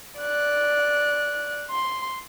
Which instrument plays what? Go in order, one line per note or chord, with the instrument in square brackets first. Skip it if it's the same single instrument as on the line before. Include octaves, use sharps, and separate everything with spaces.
[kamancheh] D5 F#6
C6